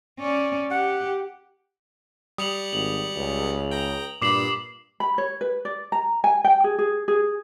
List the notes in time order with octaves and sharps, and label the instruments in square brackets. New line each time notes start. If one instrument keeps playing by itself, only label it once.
[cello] C#4 D5
[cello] G4 [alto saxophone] F#5
[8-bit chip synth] G3 C#7 [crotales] D#6 F7 F#7
[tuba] G#1 [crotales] F#7
[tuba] C#2
[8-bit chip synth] G5 A#5
[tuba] G2 [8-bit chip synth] A#2 B5 [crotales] D6 C7 F#7
[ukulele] B5
C#5
B4
D5
A#5
G#5
G5
G#4
G#4
G#4